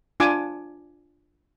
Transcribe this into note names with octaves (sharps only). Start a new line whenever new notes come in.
D4 F4 G#5 D6